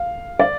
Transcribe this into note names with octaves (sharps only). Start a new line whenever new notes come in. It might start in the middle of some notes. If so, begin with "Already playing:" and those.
Already playing: F5
D5